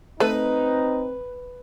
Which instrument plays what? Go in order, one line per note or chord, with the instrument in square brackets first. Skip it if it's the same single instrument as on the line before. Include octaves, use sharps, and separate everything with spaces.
[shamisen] A3 [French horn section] C4 [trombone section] D#4 [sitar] B4